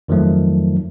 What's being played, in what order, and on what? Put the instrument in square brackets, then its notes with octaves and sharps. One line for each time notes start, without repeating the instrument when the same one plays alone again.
[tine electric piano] F2 D#3 F3 F#3 A3